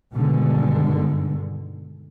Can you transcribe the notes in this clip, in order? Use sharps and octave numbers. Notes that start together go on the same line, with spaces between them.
G2 B2 D3 D#3 G#3